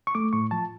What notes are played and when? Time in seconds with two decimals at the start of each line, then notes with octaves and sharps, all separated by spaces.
0.07 C#6
0.15 A3 D6
0.33 A2 C#6
0.51 F3 A5